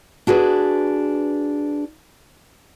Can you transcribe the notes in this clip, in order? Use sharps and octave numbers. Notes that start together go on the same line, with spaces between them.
D4 F#4 G#4 B4